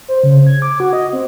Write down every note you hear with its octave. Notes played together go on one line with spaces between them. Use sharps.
C5
C#3
G#6
D6
F#4
D#5
C4